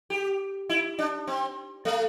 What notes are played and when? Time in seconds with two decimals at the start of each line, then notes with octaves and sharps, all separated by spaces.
0.10 G4
0.69 E4
0.99 D4
1.27 C4
1.85 A3